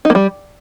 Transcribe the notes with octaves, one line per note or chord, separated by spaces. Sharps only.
D#4
A#3
G3